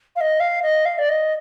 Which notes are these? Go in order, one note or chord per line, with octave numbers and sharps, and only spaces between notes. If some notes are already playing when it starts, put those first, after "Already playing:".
F5
D#5
F5
D#5
F5
D5
D#5